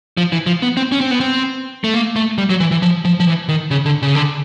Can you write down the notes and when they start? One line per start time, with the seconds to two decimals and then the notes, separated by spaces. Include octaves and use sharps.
0.17 F3
0.32 E3
0.46 F3
0.62 B3
0.77 C4
0.92 C#4
1.01 C4
1.11 B3
1.20 C4
1.84 A3
1.94 A#3
2.16 A3
2.38 G3
2.50 F#3
2.60 E3
2.71 E3
2.82 F3
3.05 F3
3.20 F3
3.27 E3
3.49 D#3
3.71 C#3
3.86 D3
4.02 C#3
4.15 D3